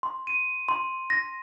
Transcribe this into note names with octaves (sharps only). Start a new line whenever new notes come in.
C6
D#7
C6
A#6